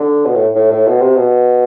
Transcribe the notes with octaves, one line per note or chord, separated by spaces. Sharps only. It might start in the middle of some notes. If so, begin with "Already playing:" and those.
Already playing: D3
B2
A2
A2
A2
B2
C3
B2